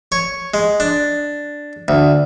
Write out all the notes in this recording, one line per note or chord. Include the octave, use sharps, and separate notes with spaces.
C#5
G#3
D4
D2